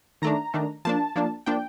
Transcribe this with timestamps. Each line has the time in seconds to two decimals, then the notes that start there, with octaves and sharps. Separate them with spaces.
0.22 D#3 A3 D4 A#5
0.54 D#3 A3 D4
0.85 F3 A#3 D4 A5
1.16 F3 A#3 D4
1.46 F3 A#3 D4 G5